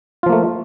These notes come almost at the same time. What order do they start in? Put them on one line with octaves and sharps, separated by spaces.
F4 F3 A#3 A3